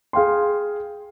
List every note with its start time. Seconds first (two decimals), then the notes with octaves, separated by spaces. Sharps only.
0.13 G#4 F5 G5 C6